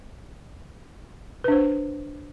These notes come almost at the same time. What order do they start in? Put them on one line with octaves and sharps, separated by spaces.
B4 D4 C5